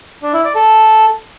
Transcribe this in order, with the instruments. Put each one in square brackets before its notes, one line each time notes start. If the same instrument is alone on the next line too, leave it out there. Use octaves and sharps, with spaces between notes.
[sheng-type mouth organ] D4
E4
D5
A4